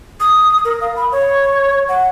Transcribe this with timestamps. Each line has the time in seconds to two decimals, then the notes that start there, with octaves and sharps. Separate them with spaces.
0.20 D#6
0.65 A#4
0.81 F5
0.96 B5
1.12 C#5
1.89 F#5